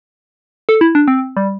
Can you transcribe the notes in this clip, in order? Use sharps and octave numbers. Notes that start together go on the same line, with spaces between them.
A4
E4
D4
C4
G3